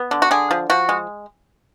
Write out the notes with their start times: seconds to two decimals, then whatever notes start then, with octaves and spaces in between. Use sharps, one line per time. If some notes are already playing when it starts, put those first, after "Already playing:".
Already playing: B3
0.11 D3
0.22 F#4
0.31 D3 G#4
0.51 F3
0.70 F3 F#4
0.89 G#3